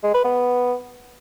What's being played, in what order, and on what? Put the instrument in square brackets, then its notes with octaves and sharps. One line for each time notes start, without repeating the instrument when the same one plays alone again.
[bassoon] G#3
B4
B3